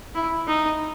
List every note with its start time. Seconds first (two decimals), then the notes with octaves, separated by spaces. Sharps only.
0.15 E4
0.48 D#4